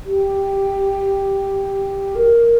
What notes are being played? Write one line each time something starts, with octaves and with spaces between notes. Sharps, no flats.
G4
A#4